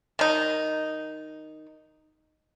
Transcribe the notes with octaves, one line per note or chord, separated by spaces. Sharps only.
D#3 D#4